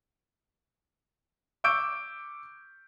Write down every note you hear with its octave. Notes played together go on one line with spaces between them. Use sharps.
C#6 D6 E6 G6 D7